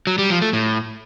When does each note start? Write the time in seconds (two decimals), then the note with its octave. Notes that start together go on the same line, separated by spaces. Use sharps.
0.07 F#3
0.18 G3
0.30 F3
0.42 A3
0.53 A2